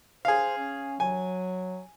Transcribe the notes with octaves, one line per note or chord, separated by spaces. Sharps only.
G#4 C5 F5
C#4
F#3 G#5